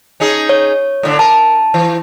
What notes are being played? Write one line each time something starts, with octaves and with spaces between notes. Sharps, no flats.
C#4 D#4 G#4
C#5
A2 D3 D4
A#4 A5
E3